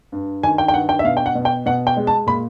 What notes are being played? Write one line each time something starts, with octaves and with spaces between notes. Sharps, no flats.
G2
D#3 G#5
G5
G5
G2 F#5
G5
E5
B2 F5
G5
F#5
B2
G5
B2 F#5
G5
G#3
A5
A#2 B5